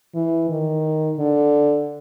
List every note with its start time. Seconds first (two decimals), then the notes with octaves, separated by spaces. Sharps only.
0.15 E3
0.49 D#3
1.18 D3